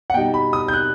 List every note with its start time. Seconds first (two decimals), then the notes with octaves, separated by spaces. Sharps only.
0.10 F#5
0.14 B2 G3 D#4 G5
0.34 B5
0.53 D#6
0.68 G6
0.73 F#6